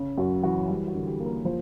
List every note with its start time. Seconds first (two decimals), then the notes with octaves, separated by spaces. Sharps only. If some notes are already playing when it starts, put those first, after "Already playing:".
Already playing: C#3
0.18 F#2 F#4
0.43 E3 F#4
0.69 G3 F#4
0.88 F#4
0.95 D3
1.06 G4
1.20 A#3
1.26 A#4
1.45 F3 C5